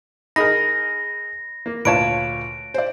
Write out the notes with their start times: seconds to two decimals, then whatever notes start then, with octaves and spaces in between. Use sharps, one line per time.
0.36 D#4 G#4 A#4 B5 A#6
1.66 A#3
1.85 D2 A#2 B4 C#5 F5 A5 D7
2.74 C5 D5